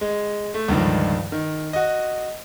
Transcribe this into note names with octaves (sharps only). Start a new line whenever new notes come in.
G#3
A3
C#2 G2 D3 D#3 F3
D#3
F#4 D#5